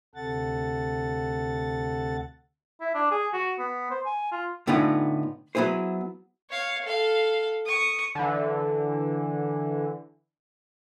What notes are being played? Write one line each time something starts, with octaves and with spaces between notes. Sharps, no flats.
D2 C3 A4 F#5 A6
E4
D4
G#4
F#4
B3
C5
G#5
F4
A2 D3 B3 C#4 D#4 F4
F#3 B3 E4 G#4 C5
C#5 F5
A4 F5
C#6 D#6
D3 E3